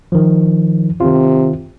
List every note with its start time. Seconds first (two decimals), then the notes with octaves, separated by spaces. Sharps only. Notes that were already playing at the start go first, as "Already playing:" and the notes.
0.12 D#3 F3
1.00 C3 D#3 F4